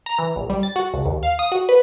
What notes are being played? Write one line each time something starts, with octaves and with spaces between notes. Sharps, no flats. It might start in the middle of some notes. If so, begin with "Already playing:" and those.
A#5
E3
A#1
G3
A6
F#4
C#2
D#2
F5
D#6
F#4
B4